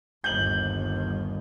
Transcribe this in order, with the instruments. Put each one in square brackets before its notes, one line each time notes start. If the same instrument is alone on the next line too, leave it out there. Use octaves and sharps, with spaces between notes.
[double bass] G1 D#2 [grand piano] G6 F#7